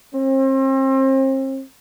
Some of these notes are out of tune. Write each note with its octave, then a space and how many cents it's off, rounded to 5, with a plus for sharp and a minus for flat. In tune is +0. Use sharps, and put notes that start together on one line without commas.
C4 +35